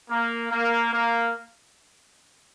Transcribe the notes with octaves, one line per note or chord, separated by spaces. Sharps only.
A#3
A#3
A#3